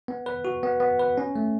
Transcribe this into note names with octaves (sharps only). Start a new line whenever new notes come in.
B3
B4
F#4
B3
B3
B4
C#4
A3